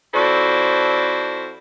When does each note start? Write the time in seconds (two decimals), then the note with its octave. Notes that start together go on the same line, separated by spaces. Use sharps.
0.14 F2 E4 F#4 A4 C5 D5